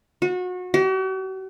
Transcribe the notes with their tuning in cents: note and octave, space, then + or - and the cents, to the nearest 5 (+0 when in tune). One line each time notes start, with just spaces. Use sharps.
F#4 -30
F#4 +45